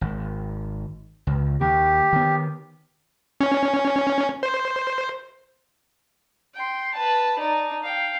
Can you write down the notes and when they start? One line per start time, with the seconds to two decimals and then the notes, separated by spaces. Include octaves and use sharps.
0.01 G#1
1.27 C#2
1.61 D#2 G4
2.13 D#3 B3
3.41 C#4
4.43 C5
6.54 G5 C6
6.94 B4 A5
7.39 D#4 D5
7.82 F5 G5